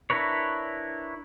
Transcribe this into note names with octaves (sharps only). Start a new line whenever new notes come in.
D4 E4 A#4 B4 C#5